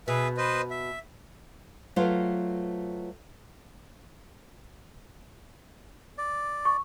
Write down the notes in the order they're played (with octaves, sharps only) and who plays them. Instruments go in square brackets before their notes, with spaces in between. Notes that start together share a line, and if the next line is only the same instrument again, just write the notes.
[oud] B2 [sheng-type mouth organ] G#4 B4 E5
[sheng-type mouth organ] B4 C5 D#5
E5
[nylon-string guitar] F#3 A3 F4 B4 C5
[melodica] D5
[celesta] C#6